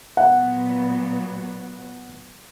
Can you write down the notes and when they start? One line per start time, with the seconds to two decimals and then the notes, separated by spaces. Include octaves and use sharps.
0.17 A#2 F#3 B3 F#5